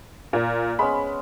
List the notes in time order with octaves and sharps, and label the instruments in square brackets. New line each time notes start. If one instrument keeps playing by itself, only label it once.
[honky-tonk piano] A#2
[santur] G#3 B3 C#4 [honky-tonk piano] B5